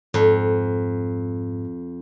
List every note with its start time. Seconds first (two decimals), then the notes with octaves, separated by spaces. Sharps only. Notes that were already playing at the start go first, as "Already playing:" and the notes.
0.14 F2 G#2